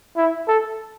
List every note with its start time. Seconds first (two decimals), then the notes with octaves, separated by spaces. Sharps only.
0.17 E4
0.48 A4